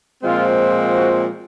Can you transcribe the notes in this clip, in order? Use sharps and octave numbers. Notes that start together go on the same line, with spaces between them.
A#2 F3 G#3 C4 F4
F#4